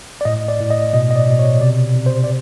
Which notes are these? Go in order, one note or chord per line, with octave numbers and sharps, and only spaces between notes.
D5
A2 D#5
D5
A2
D#5
B2 D#5
D#5
D5
B2
C#5
C3 D5
C3
C5
D5